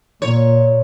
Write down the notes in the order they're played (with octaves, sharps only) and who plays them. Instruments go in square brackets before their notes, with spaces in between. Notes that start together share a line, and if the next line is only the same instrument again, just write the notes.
[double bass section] A#2 [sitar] C#5